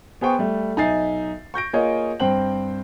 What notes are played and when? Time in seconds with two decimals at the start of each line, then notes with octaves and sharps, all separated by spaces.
0.21 B3 G#4 C5 G5 C#6
0.39 G3 A3
0.77 B1 D#4 E5 G#5 A6 C7
1.54 C#6 G6 A#6 D7
1.73 A#3 F4 G#4 C#5 D#5 F5
2.20 G2 C4 C5 G5 F#7